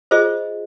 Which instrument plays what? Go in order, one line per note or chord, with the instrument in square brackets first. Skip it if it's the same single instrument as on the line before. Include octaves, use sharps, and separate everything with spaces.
[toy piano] F4 G#4 C5 D#5